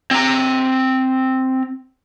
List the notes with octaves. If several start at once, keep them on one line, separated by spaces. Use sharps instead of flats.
C4 A#5